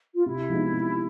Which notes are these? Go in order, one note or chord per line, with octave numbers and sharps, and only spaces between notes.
F4
C3 E4
F3 G#3 B3 D#4
C3